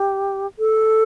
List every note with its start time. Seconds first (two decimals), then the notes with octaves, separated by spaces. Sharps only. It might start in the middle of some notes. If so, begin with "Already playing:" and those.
Already playing: G4
0.59 A4